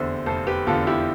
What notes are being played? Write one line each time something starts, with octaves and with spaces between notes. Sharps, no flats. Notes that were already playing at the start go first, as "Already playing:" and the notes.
Already playing: F1 E2 D3 C5 E5
F1 A4 C5
G4 B4
E2 D3 F4 A4
E4 G4